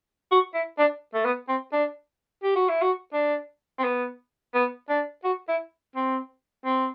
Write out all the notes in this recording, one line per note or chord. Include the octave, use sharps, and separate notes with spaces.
F#4
E4
D4
A3
B3
C4
D4
G4
F#4
E4
F#4
D4
C4
B3
B3
D4
F#4
E4
C4
C4